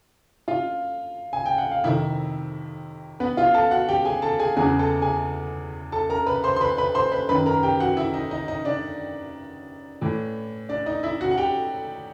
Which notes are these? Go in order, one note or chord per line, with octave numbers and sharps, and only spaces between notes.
F4 F5
G#5
G5
F#5
F5
F2 C3 D#3 E4 E5
B3 B4
F4 F5
A4 A5
F#4 F#5
G4 G5
G#4 G#5
A4 A5
G#4 G#5
E2 C#3 E3 G#4 G#5
A4 A5
G#4 G#5
A4 A5
A#4 A#5
B4 B5
C5 C6
C6
B4 B5
B4 B5
C5 C6
B4 B5
F#2 D#3 B4 B5
A#4 A#5
G4 G5
F#4 F#5
E4 E5
D#4 D#5
D#4 D#5
D#4 D#5
D4 D5
A2 E3
D4 D5
D#4 D#5
E4 E5
F#4 F#5
F#5
G4 G5